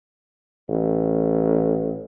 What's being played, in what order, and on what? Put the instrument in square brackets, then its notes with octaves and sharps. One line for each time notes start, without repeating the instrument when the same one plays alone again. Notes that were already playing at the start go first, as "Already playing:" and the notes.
[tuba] A1